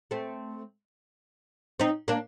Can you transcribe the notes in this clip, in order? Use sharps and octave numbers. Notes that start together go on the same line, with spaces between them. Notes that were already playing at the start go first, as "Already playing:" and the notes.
A3 C4
C4 D#4
A#3 D4